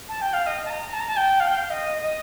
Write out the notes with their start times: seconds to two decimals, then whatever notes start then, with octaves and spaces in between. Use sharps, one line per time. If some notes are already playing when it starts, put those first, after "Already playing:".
0.09 A5
0.21 G5
0.33 F5
0.47 D#5
0.65 A5
0.70 A#5
0.93 A5
1.00 A#5
1.07 A5
1.17 G5
1.40 F5
1.48 G5
1.57 F5
1.70 D#5
2.02 D#5